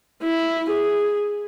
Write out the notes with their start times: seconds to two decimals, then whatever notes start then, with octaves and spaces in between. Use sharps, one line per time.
0.23 E4
0.71 G#4